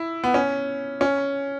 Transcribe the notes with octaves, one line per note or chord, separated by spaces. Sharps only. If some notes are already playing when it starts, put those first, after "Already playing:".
Already playing: E4
B3
C#4
C#4